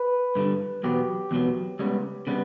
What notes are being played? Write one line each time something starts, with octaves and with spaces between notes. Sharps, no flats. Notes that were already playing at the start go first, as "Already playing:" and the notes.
Already playing: B4
G2 D3 G3
E2 B2 F#3 B3 G4
E2 B2 F#3 B3
C#2 C#3 G3 B3
C#3 G3 B3